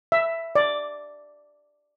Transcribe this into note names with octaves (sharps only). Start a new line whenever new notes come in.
E5
D5